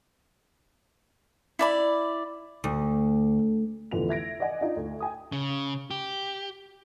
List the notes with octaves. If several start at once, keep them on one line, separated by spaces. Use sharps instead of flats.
E4 D5 B5
D2
F1 B1 D3 E3 F3 F7
E5 G#6 A#6 D7
D5 D#5 F#5 G#5
D4 D#4 F4
D2
G5 G#5 D#6
C#3
G4